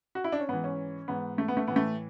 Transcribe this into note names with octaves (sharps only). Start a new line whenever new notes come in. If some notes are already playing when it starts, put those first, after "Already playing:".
F#4
E4
D4
C#4
G#2 E3 B3
C#4
G#2 E3 B3
A3
B3
A3
A2 E3 B3
A3